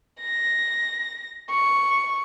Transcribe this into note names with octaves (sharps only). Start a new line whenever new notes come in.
A#6
C#6